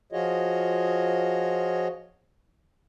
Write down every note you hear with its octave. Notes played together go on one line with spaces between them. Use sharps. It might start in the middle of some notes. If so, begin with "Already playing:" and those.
F3 F4 F#4 G#4 C#5 D#5